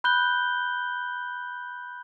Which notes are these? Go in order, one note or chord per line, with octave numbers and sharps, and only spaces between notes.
B5 F#6 G6 G7